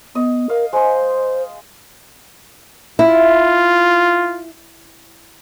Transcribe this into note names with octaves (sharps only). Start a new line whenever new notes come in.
B3 D#5
A#4 F5
G#3 C5 C6
E4 F4